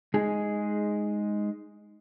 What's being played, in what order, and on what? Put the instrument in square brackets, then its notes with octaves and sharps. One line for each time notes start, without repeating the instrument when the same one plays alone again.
[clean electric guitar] G#3 D#4 G#4